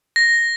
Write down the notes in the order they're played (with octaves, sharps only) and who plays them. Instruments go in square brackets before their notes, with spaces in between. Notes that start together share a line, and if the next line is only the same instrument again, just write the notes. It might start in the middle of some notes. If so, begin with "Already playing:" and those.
[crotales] A#6